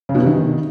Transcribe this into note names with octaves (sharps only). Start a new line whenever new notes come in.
C#3
B2
C3
D#3